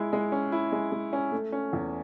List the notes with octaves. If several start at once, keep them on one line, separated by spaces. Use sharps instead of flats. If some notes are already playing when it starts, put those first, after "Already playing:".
Already playing: G#3 E4
G#3
C#4
E4
G#3
G#3
C#4
A3
C#4
E2